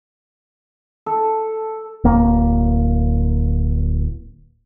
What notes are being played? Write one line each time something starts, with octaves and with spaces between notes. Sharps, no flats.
A4
D1 A#3